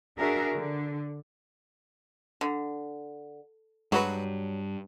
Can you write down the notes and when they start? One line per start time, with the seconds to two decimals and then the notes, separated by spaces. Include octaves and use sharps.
0.18 D4 F#4 G#4 A#4 E5
0.54 D3
2.41 D3
3.92 G2 F#3 G#3 F#4 B4